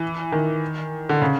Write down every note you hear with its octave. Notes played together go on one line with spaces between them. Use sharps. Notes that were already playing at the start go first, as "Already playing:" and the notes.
Already playing: E3
D#3
D3
C#3